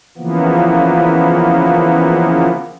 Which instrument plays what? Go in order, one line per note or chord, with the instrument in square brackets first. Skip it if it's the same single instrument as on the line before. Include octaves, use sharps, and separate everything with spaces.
[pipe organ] C#3 E3 F3 A#3 B3